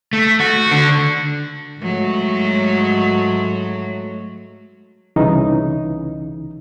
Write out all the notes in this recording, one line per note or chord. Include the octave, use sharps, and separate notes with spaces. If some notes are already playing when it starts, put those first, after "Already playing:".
A3
F#4
D3
G#2 F#3 A3
C2 C#3 E3 D#4